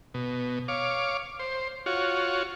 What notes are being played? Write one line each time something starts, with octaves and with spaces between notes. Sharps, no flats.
B2
C#5 F5 D6
C5
F4 F#4 C#5